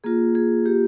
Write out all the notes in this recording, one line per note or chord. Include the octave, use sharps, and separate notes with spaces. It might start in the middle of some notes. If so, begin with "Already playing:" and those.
A#3 F4 G#4
G#4
G4